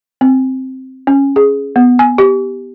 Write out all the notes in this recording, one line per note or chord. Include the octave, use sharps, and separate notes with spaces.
C4
C#4
G#4
B3
G#5
G4